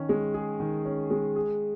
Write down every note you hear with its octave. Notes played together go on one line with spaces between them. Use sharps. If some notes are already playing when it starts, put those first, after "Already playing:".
Already playing: D#3 C#4
G#3
G#4
D#3
C#4
G#3
G#4